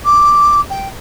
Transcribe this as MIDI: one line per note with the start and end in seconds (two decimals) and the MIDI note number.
0.05 0.60 86
0.70 0.88 79